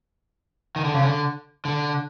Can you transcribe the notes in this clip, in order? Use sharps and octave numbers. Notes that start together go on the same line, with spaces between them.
D#3
D3
C#3
D3
D3